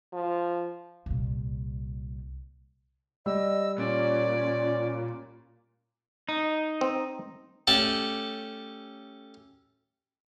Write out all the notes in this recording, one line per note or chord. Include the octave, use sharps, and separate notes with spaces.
F3
C2 A#2
G3 D#5 E6
A#2 C#4 D5
D#4
C4
A3 C#4 G4 A4 D5